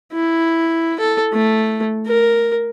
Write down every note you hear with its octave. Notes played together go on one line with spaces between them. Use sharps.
E4
A4
A3
A#4